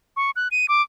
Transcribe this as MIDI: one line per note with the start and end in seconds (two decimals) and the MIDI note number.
0.17 0.31 85
0.36 0.48 90
0.51 0.66 99
0.69 0.82 86